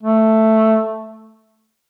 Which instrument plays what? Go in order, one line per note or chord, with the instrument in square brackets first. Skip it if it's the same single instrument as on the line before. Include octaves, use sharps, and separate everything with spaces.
[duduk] A3